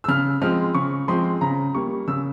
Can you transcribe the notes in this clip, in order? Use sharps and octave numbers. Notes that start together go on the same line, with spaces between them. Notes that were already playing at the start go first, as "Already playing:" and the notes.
E6
C#3 F6
F3 G#3 C4 F6
C#3 C#6
F3 G#3 C4 C6
C#3 A#5
G3 A#3 C#6
C#3 E6